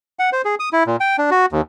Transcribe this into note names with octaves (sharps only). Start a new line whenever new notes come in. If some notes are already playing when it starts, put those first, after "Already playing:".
F#5
C5
G#4
D#6
E4
A#2
G5
D4
F#4
D#2